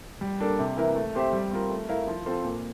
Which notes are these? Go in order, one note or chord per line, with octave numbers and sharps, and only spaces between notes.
G3
A#3 D4 A4
C3
E3 A#3 E4 A#4
A3
C4 G4 C5 E5
G3
C4 F4 A#4
A3
E4 A#4 F5
F3
C4 F4 A4 C5
A#2